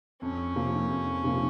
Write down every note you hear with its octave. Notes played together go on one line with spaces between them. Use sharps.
F2 C#4
C3 F3 A#3
F2
C3 F3 A#3